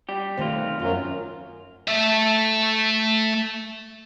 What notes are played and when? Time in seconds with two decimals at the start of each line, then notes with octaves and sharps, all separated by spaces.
0.09 G3 G4
0.38 B1 D#3 A3 C4 F4 C5
0.82 F#2 F4
1.88 A3 E5